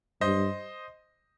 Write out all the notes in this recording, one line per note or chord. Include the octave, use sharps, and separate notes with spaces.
G2 C5 D#5